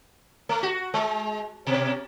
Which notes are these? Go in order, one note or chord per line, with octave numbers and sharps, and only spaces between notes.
A3
F#4
G#3
B2